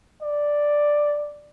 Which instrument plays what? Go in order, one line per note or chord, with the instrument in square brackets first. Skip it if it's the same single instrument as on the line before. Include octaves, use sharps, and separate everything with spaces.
[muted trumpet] D5